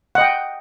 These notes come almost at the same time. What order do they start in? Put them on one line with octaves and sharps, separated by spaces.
F#5 D#5 G5